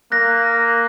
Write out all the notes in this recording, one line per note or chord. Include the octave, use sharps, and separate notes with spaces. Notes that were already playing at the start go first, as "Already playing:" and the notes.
A#3 F#6 A#6